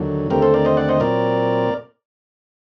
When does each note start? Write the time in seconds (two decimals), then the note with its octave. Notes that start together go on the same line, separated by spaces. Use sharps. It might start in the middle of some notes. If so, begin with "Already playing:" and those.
Already playing: D#2 D3 F#3
0.30 D#2 D3 A3 C4 G4 A#4
0.42 A4 C5
0.54 A#4 D5
0.65 C5 D#5
0.77 D5 F#5
0.89 C5 D#5
1.00 A#2 F#3 C4 A#4 D5